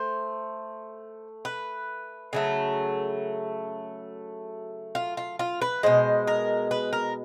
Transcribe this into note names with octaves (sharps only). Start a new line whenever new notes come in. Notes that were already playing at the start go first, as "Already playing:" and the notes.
Already playing: A3 C5
B4
C#3 F#3 A3
F4
F4
F4
B4
B2 G#3 C5
A#4
B4
A#4